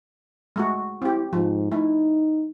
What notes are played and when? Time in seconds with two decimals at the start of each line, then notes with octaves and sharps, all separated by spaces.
0.56 G#3 A3 F#4
1.02 C4 E4 G4
1.33 G#2 F3
1.72 A3 D#4 E4